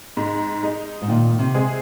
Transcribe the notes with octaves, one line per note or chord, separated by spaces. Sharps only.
G#2
G#3 D#4
G#2
A#2 D#3
C3
G#3 C4 G#4